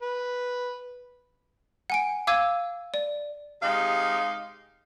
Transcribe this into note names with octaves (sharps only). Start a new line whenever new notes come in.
B4
F#5 G#5 D7
F5 D6 E6 G#6 D#7
D5
C3 G#3 D#4 G4 F5